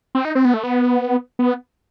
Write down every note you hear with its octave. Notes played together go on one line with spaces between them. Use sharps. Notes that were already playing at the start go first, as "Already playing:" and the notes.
C4
D#4
C4
B3
A3
B3
B3